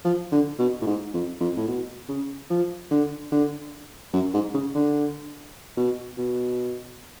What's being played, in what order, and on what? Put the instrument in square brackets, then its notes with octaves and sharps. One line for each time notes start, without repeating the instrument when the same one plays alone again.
[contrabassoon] F3
D3
B2
A2
G#2
F2
F2
A2
B2
C#3
F3
D3
D3
F#2
G#2
C#3
D3
B2
B2